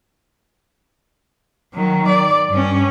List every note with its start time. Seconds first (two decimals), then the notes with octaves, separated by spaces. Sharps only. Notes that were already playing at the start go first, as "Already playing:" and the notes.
1.74 D#3 F#3
2.09 D5
2.50 G2 C#4